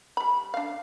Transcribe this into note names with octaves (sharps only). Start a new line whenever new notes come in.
G3 B5
D4 F5